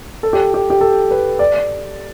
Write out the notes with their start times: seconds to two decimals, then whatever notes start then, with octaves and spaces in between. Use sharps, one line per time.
0.23 A4
0.33 G4
0.54 G4
0.70 G4
0.81 A4
1.11 B4
1.39 D5